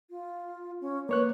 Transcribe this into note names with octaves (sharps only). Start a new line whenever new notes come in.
F4
C#4
A#3 B4 C#5 F#6